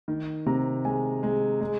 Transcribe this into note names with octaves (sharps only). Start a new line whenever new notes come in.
D#3
C3 A#5
G#3 G#5
G#3
G#3